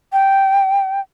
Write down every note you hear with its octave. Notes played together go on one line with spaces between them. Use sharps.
G5